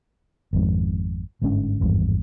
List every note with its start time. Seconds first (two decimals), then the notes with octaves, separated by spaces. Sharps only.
0.53 G#1 F2 G#2
1.42 G1 G#2 D3 C#4
1.81 G#1 E2 G2